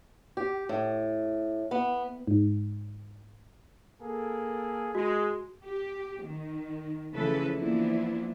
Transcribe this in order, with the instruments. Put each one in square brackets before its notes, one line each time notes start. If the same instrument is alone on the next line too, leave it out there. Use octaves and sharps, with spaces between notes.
[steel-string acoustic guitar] G4
A2
B3
[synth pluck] G#2
[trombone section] A#3 G#4 A4
[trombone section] G#3 [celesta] F#4
[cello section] G4
D#3
C#3 E3 F3 A3 A4 B4
E3 F3 A#3 B3 D4 E4